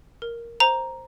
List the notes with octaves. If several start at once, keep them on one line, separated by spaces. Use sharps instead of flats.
A#4
C5 A#5